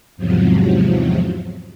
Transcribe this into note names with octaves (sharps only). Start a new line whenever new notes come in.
E2 G#2 C3 F3 F#3